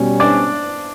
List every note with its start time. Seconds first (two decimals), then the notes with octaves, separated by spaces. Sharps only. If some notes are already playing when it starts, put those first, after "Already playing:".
Already playing: B2 G3 C#4
0.20 D4 D5